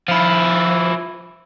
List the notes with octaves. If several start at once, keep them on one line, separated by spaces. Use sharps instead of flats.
F3 E4